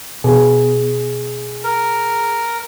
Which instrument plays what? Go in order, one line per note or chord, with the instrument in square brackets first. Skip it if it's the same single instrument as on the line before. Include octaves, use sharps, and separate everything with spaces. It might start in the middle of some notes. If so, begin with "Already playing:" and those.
[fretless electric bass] B2 [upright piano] G#4
[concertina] A#4